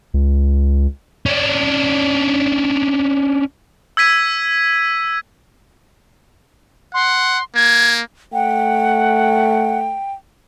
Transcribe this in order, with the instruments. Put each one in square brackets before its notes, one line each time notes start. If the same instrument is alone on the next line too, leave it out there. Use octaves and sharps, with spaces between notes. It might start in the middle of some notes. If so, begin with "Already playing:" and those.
[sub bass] C#2
[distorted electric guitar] C#4 D4
[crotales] E6 G#6 B6 D#7
[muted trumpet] F#5 [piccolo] C6
[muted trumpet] A#3 [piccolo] G#6
[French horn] A3 [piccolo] F#5 [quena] G5